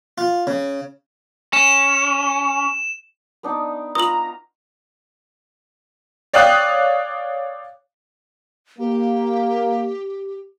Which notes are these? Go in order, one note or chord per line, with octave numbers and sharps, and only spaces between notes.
F4
C#3
C#4 E7
B3 D4 D#4
F4 B4 A#5 D#6 F#7
C#5 D5 F5 G5 D#6 F#6
A#3 G4